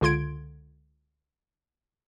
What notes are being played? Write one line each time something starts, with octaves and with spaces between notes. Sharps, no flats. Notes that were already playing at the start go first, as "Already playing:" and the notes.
C#2 D3 F4 C6 G#6 D7